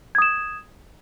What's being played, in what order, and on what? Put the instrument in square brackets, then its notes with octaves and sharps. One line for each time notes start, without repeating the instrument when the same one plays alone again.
[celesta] G#6
D#6
E7